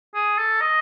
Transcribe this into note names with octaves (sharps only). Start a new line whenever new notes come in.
G#4
A4
D#5